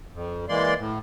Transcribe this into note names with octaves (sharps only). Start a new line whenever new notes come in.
F2
E3 G#3 A#3 D5 C6
A2